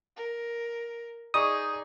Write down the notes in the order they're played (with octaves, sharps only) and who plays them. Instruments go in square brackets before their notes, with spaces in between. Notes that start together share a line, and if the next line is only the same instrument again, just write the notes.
[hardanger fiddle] A#4
[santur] D#4 D5 C#6 [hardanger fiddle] G#4 [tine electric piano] D#6